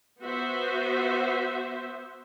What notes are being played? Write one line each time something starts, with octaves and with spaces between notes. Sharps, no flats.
B3 F#4 C5 E5